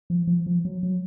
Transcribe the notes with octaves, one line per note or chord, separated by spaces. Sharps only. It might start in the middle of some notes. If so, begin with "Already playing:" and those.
F3
F3
F3
F#3
F#3